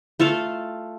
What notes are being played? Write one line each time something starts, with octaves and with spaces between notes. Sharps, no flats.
A3 F4 A4 F5